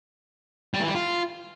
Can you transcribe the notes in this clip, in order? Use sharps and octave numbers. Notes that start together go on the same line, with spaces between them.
G3
E3
G3
F4